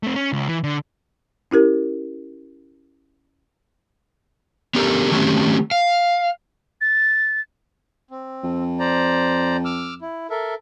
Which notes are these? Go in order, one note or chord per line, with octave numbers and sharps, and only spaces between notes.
A3 C4
C#4
C#2
E3
D3
C#4 E4 G4 A#4
B3 C#4 D4 G4 A4 A#4
D#3 F#3 A3 C4 C#4 G4
F5
A6
C4
F2
C5 D5 A#5
D6 E6 F6
E4
A4 A#4 E5